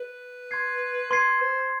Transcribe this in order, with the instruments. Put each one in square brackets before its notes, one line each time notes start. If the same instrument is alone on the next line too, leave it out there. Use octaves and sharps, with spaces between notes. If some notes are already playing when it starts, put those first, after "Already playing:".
Already playing: [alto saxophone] B4
[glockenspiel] C6 G#6 C7
[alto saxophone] B4 [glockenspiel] C6 G#6 C7
[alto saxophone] C5